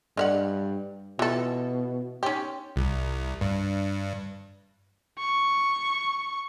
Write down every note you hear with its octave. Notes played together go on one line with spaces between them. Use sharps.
G2 D4 A4 D5 D#5 F5 F#5
B2 E3 F4 A4
C#4 D#4 G4 C#5 C6
C2
G2
C#6